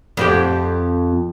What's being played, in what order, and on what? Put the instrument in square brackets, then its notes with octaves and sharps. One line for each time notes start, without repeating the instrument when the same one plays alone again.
[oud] F2 C4 G4